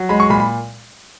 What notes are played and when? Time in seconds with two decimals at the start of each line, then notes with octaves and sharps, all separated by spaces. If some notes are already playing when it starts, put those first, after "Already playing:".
Already playing: F#3
0.09 G#3 B5
0.20 C#6
0.30 A#2 B5
0.40 B5